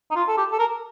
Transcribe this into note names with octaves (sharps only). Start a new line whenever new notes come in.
D#4
F4
A4
G4
A4
A#4